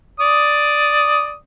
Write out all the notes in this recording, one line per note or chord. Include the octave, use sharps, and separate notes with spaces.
D5 D#6